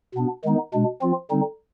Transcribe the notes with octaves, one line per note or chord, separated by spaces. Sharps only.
B2 B3 D4
D#3 G#3 B3 D#4
B2 G#3 D4
F3 C4 F4
D3 G3 C4 D#4